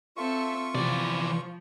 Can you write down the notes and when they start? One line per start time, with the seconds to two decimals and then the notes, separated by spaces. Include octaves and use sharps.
0.17 C4 F4 A4 E5 C#6
0.75 C3 E3 F3 D5